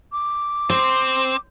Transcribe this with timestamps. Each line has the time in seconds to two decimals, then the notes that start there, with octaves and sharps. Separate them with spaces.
0.12 D6
0.70 C4 C5